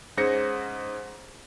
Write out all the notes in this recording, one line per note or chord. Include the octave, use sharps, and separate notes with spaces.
G#2 C#4 G#4 C5 A#6 C#7